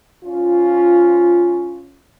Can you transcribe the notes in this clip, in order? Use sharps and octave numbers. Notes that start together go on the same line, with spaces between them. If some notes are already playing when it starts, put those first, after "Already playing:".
F3 C#4 F4